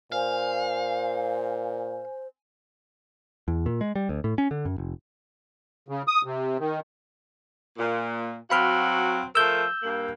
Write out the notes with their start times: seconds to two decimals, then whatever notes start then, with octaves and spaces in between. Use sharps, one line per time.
0.12 A#2 C5 F5 G#5
3.48 E2
3.66 A#2
3.81 G#3
3.95 G3
4.09 D2
4.24 A2
4.38 C#4
4.51 D3
4.65 F#2
4.78 F1
5.88 C#3
6.08 D#6
6.25 C3
6.59 D#3
7.78 A#2
8.50 F#3 C4 F#4 F5 B5 F6
9.35 F3 A3 A#4 E6 G6
9.83 G2 A#3